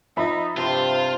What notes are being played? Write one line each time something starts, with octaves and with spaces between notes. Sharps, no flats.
F3 D#4 E5 B5
G2 C3 F4 C5